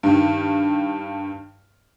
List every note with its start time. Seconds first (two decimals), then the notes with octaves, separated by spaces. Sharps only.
0.03 G2 D#3